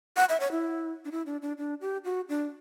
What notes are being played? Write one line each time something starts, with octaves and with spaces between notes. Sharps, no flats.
F#5
E5
C#5
E4
D4
E4
D4
D4
D4
G4
F#4
D4